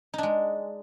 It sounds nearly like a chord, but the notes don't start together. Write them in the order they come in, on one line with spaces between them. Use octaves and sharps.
D#4 D4 G#3